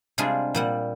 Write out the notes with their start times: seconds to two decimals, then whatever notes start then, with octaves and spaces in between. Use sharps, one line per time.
0.18 C3 G3 G#3 D4 F4 G#4
0.55 A#2 G3 F#5